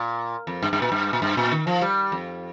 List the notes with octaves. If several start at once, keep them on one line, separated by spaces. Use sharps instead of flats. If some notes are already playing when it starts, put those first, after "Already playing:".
Already playing: A#2
F2
G2
G2
A#2
G2
A#2
G2
A#2
D#3
F3
G3
F2